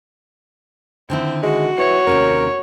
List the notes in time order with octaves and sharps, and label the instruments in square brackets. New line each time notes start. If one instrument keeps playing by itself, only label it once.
[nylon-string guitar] D3 D#3 E4 [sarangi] C4
[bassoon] G#3 [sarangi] F#4
[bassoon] E3 [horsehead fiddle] C#5
[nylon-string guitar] D#2 C3 C#4 [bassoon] A#4